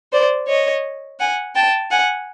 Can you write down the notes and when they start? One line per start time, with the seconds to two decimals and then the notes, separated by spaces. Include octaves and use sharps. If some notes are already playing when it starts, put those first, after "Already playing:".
0.13 C5 D5
0.48 C#5 D#5
1.19 F#5 G#5
1.55 G5 A5
1.91 F#5 G#5